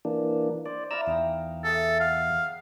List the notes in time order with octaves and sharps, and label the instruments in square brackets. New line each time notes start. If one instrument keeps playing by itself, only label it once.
[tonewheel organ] E3 A#3 D4
[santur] C5 [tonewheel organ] D5
[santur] E4 B4 F5 [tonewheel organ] D5 A#5 E6
[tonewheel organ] E2 [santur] D#4 G5 A#5
[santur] G#4 E5 F5 [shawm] A4
[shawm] F5 [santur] F#5